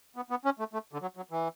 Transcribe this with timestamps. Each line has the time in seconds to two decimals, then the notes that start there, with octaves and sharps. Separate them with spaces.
0.16 B3
0.30 B3
0.45 C#4
0.59 A3
0.73 A3
0.93 D3
1.02 F#3
1.17 F#3
1.31 E3